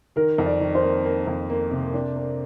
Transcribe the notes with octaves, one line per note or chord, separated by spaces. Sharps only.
D#3 A#4
F2
D5
D#3
C5
A#3
A#3
F2
A#3
C3
D4
A#3